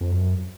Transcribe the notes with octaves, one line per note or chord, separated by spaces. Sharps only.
F2
F#2